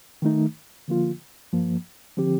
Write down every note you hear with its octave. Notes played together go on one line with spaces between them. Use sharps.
D#3 A3 D#4
D3 F3 A#3 F4
G2 F3 A#3
D3 F3 C4 G4